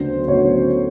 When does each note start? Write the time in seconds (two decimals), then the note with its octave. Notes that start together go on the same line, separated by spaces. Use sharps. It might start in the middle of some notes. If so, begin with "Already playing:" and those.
Already playing: D2 C#3 F#3 B3 D4 C5
0.28 D2 C#3 F#3 B3 D4 C#5